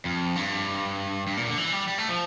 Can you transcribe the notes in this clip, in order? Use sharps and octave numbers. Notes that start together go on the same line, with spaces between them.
F2
G2
G2
A#2
D3
E3
G3
G3
A3
F3